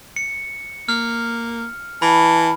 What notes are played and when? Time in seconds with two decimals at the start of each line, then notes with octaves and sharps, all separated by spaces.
0.16 C#7
0.89 A#3 F6
2.02 E3 A5 B5